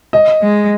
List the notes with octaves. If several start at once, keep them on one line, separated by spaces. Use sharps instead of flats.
D#5
G#3